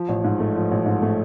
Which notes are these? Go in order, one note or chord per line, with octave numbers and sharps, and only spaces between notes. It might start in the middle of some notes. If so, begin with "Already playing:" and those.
Already playing: F3
A1
G#2
A3
F3
A1
G#2
A3